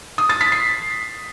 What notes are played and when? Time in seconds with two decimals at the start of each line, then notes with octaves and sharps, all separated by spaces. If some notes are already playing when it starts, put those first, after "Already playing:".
0.18 D#6
0.29 A6
0.41 B6
0.52 C7